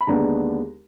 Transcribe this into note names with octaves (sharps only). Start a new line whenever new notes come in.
B5
D#2 D3 G#3 B3 D4 A#5